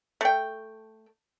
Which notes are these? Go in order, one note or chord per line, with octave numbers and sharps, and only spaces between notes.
A3 G5